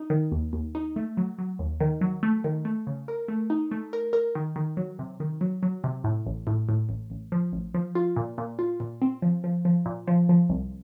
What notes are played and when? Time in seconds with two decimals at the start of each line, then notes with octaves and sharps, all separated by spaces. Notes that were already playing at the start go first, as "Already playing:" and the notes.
Already playing: D#4
0.10 D#3
0.32 D#2
0.53 D#2
0.75 D#4
0.96 A3
1.17 F#3
1.38 F#3
1.59 D#2
1.80 D#3
2.01 F#3
2.23 A3
2.44 D#3
2.65 A3
2.87 C#3
3.08 A#4
3.28 A3
3.50 D#4
3.71 A3
3.93 A#4
4.13 A#4
4.35 D#3
4.56 D#3
4.77 F#3
4.99 C3
5.20 D#3
5.41 F#3
5.63 F#3
5.84 C3
6.04 A2
6.26 A1
6.47 A2
6.69 A2
6.89 A1
7.10 A1
7.32 F3
7.52 A1
7.74 F3
7.95 F4
8.16 A#2
8.38 A#2
8.59 F4
8.80 A#2
9.02 C4
9.22 F3
9.44 F3
9.65 F3
9.86 A#2
10.08 F3
10.29 F3
10.49 C2